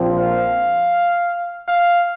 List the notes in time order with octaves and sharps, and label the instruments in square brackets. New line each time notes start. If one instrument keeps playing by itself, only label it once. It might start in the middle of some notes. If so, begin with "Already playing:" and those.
Already playing: [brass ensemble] A#1 A#2 F3 C4
[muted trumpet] F5
F5